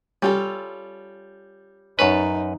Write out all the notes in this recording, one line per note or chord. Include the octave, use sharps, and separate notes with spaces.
G3 C#4 F4 A4
F#2 D#4 G#4 B4 C#5 A5